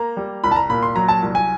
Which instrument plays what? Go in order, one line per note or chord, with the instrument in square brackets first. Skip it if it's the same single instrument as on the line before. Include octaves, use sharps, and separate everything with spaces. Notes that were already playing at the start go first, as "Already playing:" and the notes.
Already playing: [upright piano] A#3 A#5
G3
C2 B5
A5
A#5
A#2 B5
C6
F#3 A#5
A5
C2
G#5